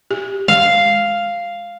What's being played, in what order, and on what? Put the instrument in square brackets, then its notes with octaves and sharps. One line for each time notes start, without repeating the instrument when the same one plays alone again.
[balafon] G4
[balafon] G#3 [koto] F5